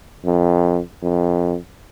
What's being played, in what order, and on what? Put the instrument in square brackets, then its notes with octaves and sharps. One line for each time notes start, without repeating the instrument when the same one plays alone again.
[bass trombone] F2
F2